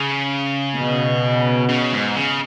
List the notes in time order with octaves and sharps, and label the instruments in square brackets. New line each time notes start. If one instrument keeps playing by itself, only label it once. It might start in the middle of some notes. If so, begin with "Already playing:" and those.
Already playing: [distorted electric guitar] C#3
[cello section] B2
[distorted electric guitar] C#3
G#2
C#3